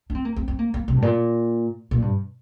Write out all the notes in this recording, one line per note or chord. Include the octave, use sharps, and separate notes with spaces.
D4
C4
A#3
C4
C4
A#3
A#3
C3
G2
A#2
A#2
G2